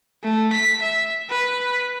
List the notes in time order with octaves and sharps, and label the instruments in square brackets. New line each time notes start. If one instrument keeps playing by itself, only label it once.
[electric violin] A3
B6
E5
B4